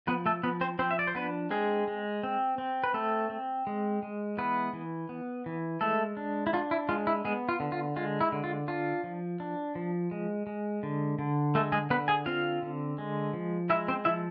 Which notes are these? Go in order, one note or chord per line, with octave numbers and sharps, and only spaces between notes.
F3 B3 B4
A3 A4
F3 B3 B4
C4 C5
F3 C4 C5
E5
D5
C5
B3 D4 B4
G#3 C4 G#4
G#3
C4
C4
B4
A3 C4 A4
C4
G#3
G#3
E3 B3 B4
E3
B3
E3
G#3 A3 A4
D4
E4
D4 F4
E4
G#3 F4
E4
G#3 B3 G#4
F4
D3
F4
G#3 F4
E4
D3
F4
D4 F4
F3
D4
F3
G#3
G#3
D3
D3
G#3 A3 A4
G#3 G#4
D3 B3 B4
G#4 G#5
C4 F4 F5
D3
G#3
F3
G#3 E4 E5
C4 C5
F3 E4 E5